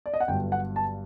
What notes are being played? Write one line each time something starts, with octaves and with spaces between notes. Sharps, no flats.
D5
D#5
F#5
G1 G2 F#3 G5
F#5
A5